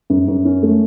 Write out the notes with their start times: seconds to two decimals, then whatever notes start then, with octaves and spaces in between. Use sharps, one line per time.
0.10 F#2
0.28 F#2
0.45 C#4
0.63 A3